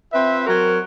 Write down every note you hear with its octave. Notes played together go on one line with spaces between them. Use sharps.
C4 F4 B4 E5
F#3 C4 F#4 A#4